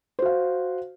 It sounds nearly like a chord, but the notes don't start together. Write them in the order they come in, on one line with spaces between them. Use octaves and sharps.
C5 F#4 F5